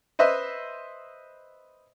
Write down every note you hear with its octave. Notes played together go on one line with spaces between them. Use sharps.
B4 C5 D#5 E5 C6